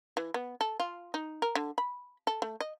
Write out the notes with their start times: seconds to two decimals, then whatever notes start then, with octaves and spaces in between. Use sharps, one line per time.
0.17 E3
0.34 B3
0.61 A4
0.80 F4
1.14 D#4
1.42 A#4
1.55 D3
1.78 B5
2.27 A4
2.42 A3
2.60 D#5